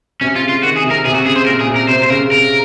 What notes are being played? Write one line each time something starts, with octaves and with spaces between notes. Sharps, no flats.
C3 C#4
F4
C#3
F4
D#3 F#4
G#4
C3
A#4
C3 G#4
F#4
C#3 G#4
C5
A#2 A#4
G#4
C3
A#4
C3 C5
C5
C#3 A#4
C#3 A#4